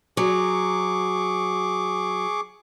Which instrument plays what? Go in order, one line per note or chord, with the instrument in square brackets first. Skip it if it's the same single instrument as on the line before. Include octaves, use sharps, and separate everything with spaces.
[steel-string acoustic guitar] F#3 [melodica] G#4 C#6 D6